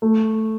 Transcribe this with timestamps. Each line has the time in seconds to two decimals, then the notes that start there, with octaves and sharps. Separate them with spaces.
0.02 A3